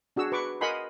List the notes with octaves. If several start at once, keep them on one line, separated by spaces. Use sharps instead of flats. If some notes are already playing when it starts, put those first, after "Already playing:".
D4 F#4 G#4 E6
B4 C#6 D6
A#4 D#5 F#5 G#5 B5 C6